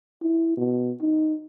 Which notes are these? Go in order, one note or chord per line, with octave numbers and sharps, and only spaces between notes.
E4
B2
D#4